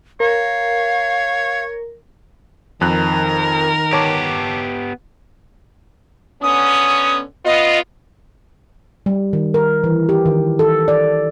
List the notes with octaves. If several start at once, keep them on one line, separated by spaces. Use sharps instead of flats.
A#4 C#5 F5
F2 D#3 A#4 F#6
B3 G4 C#5 A5 D6
D3 B3 C#4 D#6
B3 F4 D#5
G3
D#3
A#4
E3
G4
D#3
A4
D5